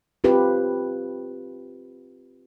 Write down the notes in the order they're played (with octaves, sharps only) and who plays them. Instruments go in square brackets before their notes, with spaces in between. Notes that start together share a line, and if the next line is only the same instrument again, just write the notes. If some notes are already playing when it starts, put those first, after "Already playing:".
[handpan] C4 F4 G4 B4